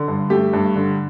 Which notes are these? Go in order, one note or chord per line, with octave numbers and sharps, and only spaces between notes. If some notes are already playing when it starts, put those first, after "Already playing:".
Already playing: D3
G2
A3 G4
G2
D3